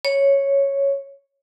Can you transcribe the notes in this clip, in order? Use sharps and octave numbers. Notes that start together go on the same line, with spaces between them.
C#5